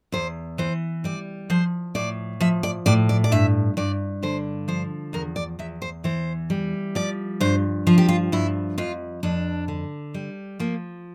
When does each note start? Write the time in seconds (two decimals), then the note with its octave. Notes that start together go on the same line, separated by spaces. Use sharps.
0.12 E2 C5
0.58 E3 C5
1.04 G3 D5
1.50 F3 C5
1.95 A2 D5
2.41 F3 E5
2.63 D5
2.86 A2 D5
3.09 D5
3.24 D5
3.32 G2 E5
3.77 G2 D5
4.23 D3 C5
4.68 F3 C5
5.13 E2 A#4
5.36 D5
5.59 E2 E5
5.82 C5
6.04 E3 C5
6.50 G3
6.95 F3 D5
7.41 G2 C5
7.87 F3 F4
7.98 G4
8.09 F4
8.32 G2 E4
8.78 F2 F4
9.23 F2 D4
9.68 D3
10.14 G3
10.60 F3 A#3